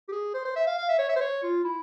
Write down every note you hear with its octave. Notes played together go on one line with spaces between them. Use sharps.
G4
G#4
C5
C5
E5
F5
F5
E5
C#5
E5
C5
C#5
F4
E4